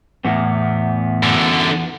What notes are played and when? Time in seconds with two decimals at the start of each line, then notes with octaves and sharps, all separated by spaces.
0.25 E2 A2 B3
1.23 F#2 D3